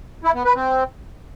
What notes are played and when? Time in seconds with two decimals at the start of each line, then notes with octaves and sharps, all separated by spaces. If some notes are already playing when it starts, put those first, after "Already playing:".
0.24 E4
0.34 B3
0.45 B4
0.55 C4